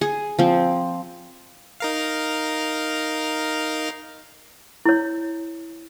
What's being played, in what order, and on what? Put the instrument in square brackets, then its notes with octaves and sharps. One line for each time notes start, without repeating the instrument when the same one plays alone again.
[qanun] G#4
F3 C4
[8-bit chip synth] D#4 A#4 F5
[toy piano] E4 C#5